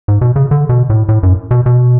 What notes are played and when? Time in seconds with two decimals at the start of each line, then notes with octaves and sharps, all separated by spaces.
0.08 G#2
0.21 B2
0.36 C#3
0.51 D3
0.69 B2
0.90 A2
1.09 A2
1.23 F#2
1.51 B2
1.66 B2